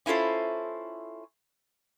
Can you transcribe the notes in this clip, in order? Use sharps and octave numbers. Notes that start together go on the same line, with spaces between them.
C#4 E4 F4 A4 C5